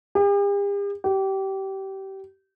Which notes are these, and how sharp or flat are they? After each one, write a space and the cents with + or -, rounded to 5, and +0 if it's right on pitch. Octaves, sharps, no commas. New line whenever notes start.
G4 +45
G4 -25